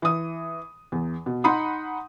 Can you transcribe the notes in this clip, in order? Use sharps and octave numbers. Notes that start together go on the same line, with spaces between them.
E3 D#6
E2
B2
D#4 F#5 B5 C6 D#6